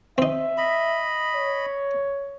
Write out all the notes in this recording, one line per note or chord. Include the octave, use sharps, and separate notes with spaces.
C4 D#4 E5
D#5 B5
C#5